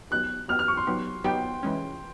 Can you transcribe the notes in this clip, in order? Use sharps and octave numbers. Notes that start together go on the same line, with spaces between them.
F#3 B3 D#4 G4 F#6
F#3 B3 D#4 G4 F6
F6
C#6
C6
F#3 B3 D#4 G4
F#3 B3 D#4 G4 G5
E3 G#3 C#4